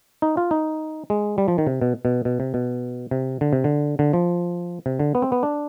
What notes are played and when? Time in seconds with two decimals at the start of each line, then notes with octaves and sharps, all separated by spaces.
0.22 D#4
0.37 F4
0.51 D#4
1.10 G#3
1.38 G3
1.48 F3
1.58 D#3
1.67 C3
1.82 B2
2.05 B2
2.25 B2
2.40 C3
2.54 B2
3.11 C3
3.41 D3
3.53 C3
3.64 D3
3.99 D3
4.13 F3
4.86 C3
4.99 D3
5.15 B3
5.22 C4
5.32 B3
5.43 D4